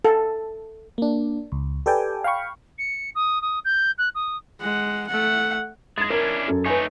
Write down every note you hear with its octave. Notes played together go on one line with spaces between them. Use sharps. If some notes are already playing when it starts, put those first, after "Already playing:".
A4
A#3 D4
C#2
G4 A4 B4 D5 G5 G#5
F5 G5 B5 C#6
C#7
D#6
D#6
G6
F#6
D#6
G#3 F#5
A3 F#5
G#3 G#6 A6
C#4 D4 E4 A#4
F#2 A4
A3 D#4 B4 C#5 G#5